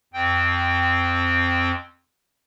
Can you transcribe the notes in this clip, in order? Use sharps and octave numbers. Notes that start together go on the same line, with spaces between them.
F2 C4 G5